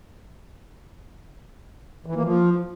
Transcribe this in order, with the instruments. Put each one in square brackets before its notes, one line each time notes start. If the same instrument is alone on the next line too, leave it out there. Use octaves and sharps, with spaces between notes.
[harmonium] E3
A#3
F3